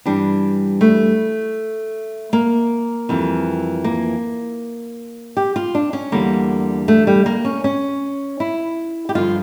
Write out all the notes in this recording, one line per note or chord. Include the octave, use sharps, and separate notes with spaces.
G2 E3 G3 D4
A3
A#3
F2 E3 G3
A#3
G4
F4
D4
C#4
E2 D3 G3 A#3
A3
G3
A#3
C#4
C#4
E4
G4
G2 D3 F3 F4